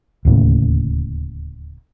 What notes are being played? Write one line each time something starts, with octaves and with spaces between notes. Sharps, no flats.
D1 D#2 A2 C#3